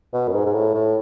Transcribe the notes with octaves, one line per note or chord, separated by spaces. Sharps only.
B2
F#2
G#2
G#2
A2
A2